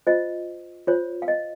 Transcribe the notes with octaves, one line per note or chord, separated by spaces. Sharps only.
F4 C5 D#5
F4 C5 C#5
F5
D#5